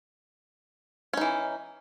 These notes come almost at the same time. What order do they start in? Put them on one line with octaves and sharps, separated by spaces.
C#4 D#4 E3